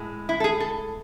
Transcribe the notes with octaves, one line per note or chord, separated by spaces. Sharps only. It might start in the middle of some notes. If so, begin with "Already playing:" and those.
Already playing: A2 G#3
E4
A4
G#4
A4